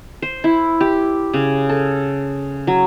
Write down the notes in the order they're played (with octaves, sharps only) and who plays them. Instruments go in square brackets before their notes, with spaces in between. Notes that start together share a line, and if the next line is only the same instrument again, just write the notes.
[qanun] C5
E4
G4
C#3
A4
F#3